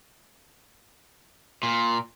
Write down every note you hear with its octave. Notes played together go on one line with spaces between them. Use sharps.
A#2